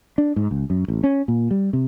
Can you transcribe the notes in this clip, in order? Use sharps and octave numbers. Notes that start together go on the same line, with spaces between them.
D4
G#2
C#2
F#2
A1
C#4
A#2
G3
C3